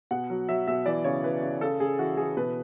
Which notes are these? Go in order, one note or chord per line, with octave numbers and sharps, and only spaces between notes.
B2 F#5
F#3
F#3 E5
B2 E5
E3 D5
C#3 C#5
E3 B4
C#3
C#3 A4
C#3 G#4
E3 F#4
E3 G#4
B2 B4